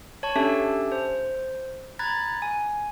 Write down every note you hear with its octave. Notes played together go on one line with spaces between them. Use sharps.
C#5 A5 C#6
C#4 D4 G4 A4 E5 A5
C5
A#5 B5 F#6 G#6 A6
G#5